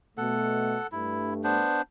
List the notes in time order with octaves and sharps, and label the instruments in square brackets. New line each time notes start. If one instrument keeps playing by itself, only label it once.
[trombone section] B2 A3 [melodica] A4 F#5
[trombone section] G2 A3 [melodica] E4
[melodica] B3 D4 C5